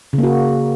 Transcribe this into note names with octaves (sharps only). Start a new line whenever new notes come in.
C#3
A#3
F#4